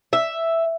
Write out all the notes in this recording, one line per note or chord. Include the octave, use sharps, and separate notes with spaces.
E5